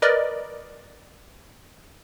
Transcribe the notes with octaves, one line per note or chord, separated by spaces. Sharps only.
A#4 B4 D5 D#5